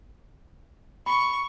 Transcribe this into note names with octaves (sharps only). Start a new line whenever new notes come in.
B5 C#6